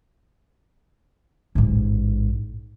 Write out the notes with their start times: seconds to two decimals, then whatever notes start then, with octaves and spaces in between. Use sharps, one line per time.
1.55 A1 G#2